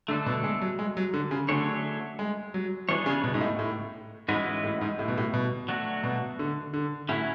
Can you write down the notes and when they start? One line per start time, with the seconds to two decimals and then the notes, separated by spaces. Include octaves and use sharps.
0.08 D3 A3 D4 A4
0.26 B2
0.44 G#3
0.61 F#3
0.79 G#3
0.97 F#3
1.14 D3
1.31 C#3
1.49 D3 F#3 A3 D4 G#4 C#5
2.19 G#3
2.54 F#3
2.89 E3 B3 D4 G#4 C#5
3.06 C#3
3.24 B2
3.34 G#2
3.41 A2
3.59 A2
4.28 G#2 E3 G#3 C#4 F#4 B4
4.64 A2
4.81 G#2
4.99 A2
5.08 B2
5.18 A2
5.34 B2
5.69 F#3 A3 D4 F#4
6.03 B2
6.39 D3
6.73 D3
7.09 A2 F#3 C#4 E4